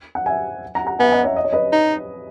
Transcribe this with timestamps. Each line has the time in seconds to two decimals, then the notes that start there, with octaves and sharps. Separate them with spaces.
0.15 F#5
0.26 E5 G#5
0.75 F#5 A#5
0.87 F#5 A#5
0.99 B3 E5 G#5
1.12 D#5 F#5
1.23 C#5 E5
1.36 D#5
1.45 C#5
1.53 B4 D#5
1.73 D#4